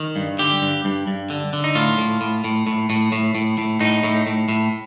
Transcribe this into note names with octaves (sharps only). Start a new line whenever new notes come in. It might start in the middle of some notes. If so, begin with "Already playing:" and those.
Already playing: D#3
G2
D3 G4
G2
G2
G2
D3
D3
D#4
A2 F4
A2
A2
A2
A2
A2
A2
A2
A2
A2 D#4
A2
A2
A2